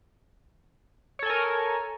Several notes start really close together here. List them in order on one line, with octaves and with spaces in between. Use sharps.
C#5 A4 G#5 A#4